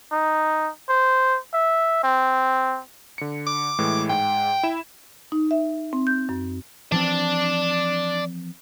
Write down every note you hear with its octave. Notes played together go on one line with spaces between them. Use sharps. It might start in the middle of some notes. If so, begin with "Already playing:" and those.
D#4
C5
E5
C4
D3 C#7
D6
A2 E3 G#3
G#2 G5
E4 E7
D#4
E5
C4
G6
F#2
E3 F3 C4 D5 A5